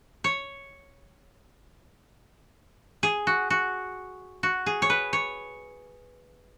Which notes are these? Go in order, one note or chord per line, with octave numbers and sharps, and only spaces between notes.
C#5
G#4
F#4
F#4
F#4
G#4
C#5
B4
C#5